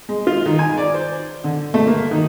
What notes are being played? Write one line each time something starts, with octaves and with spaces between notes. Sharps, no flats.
G#3
F4
D#3
G#5
D5
C5
D3
A3
A#3
D#3